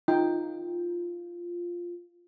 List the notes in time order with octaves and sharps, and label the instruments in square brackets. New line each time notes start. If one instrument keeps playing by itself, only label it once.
[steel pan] D#4 G5 [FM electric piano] F4